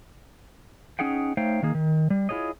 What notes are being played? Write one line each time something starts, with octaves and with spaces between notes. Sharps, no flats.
C#4 D#4 G#4 F#5 G5
A3 D#4 C5 C#5 F5 G5
D#3 A#3 G#4
D#3
G3
E4 F4 G#4 C#5 D#5